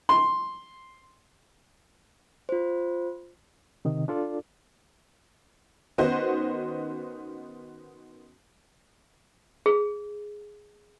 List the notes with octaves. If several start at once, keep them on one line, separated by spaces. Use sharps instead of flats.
C6
F4 C5
C3 D#3 D#5
D4 F4 A4 D5
D#3 B3 C#4 D#4 F#4 C5
G#4